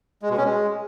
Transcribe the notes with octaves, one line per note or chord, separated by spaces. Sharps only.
G#3
B2
C#4
G#3